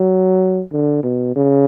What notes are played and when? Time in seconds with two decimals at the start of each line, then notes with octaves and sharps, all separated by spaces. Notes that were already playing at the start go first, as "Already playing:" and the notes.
Already playing: F#3
0.72 D3
1.03 B2
1.36 C#3